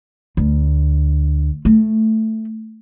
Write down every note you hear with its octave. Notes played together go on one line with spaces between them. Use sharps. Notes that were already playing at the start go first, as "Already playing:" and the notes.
D2
A3